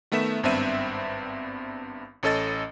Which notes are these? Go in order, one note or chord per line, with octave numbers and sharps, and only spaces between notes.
D#3 A3 B3 E5 B6 E7
G#1 G2 B3 C4 E5 D#7
A1 C#4 A4 D#5 A6